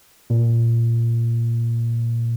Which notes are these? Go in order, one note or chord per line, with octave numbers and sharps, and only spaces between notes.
A#2